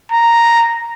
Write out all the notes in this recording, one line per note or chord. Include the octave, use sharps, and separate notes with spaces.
A#5